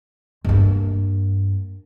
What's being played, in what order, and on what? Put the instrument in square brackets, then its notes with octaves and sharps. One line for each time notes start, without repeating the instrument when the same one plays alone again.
[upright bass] G2 A#3